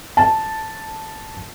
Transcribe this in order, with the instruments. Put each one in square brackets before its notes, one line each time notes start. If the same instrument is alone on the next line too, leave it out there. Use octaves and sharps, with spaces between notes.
[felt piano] A5